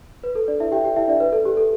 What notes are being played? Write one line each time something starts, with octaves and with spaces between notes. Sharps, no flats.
B4
A4
D4 D5
E4 E5
G4 G5
G4 G5
E4 E5
D4 D5
B4
A4
G4
A4